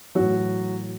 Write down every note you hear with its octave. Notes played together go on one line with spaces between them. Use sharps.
A2 E3 F#3 F#4